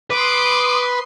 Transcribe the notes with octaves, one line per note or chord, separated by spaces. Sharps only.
B4 C6 D6 D#6 C7